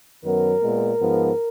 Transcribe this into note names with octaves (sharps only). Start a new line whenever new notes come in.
F#2 D#3 F#3 B3 A#4
A#2 G#3 B3
G#2 F3 B3